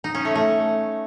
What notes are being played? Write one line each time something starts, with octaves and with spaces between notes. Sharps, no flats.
D#4
C#4
A3
A3